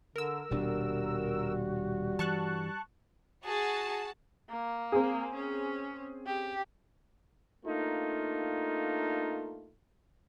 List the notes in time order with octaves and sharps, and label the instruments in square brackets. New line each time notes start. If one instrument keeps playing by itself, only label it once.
[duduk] D3 [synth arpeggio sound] A#4 E6
[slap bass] D#1 B2 D4 [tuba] G3 [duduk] F#4
[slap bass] G2 E3 [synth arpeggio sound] A5 C#6 F#6
[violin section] F#4 F#5 A5 [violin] G#4
[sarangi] A#3
[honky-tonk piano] C4 G#4
[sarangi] C#4
G4
[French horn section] A3 A#3 D4 D#4 F4